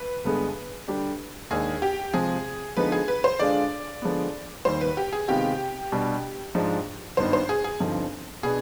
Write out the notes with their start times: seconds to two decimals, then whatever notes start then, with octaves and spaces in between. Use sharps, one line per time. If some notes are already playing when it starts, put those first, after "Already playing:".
Already playing: B4
0.24 G1 G2 D3 G#3 B3
0.88 D3 G3 D4 G4
1.51 D#2 D#3 G#3 D4 G#4
1.82 G4
2.13 C3 F3 G#3 G#4
2.77 D3 F3 G#3 B3 D#4 B4
2.92 G#4
3.08 B4
3.24 C5
3.39 D3 G#3 D4 F4 D5
4.02 D3 F3 G#3 B3
4.65 D#2 D#3 G3 C5
4.81 B4
4.97 G4
5.13 G#4
5.28 C3 D#3 G#3 B3 F4 G4
5.92 B2 G3 D4
6.55 G#2 F3 G#3 D4
7.17 G#1 G2 D#3 B3 D#4 C5
7.33 C5
7.49 G#4
7.64 G#4
7.80 G1 G2 F3 C4 D#4
8.43 B2 B3 D4 G#4